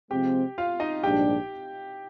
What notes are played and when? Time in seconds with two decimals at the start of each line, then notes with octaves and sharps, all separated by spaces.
0.11 C3 F3 G#3 C4 G4 G5
0.58 F4 F5
0.80 D#4 D#5
1.03 A#1 G#2 G3 D4 G4 G5